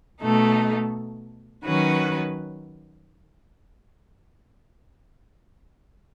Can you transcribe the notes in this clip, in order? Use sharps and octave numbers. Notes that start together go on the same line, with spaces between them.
B2 A3 D#4 A4
D#3 F#3 C#4 F#4 B4